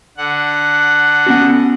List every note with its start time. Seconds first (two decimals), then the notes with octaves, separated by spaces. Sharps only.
0.17 D3 F#5
1.26 B3 C#4 F#4